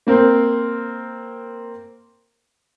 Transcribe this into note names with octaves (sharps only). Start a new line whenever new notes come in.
A#3 C4 A#4 C5